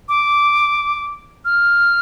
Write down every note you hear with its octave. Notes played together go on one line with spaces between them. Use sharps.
D6
F6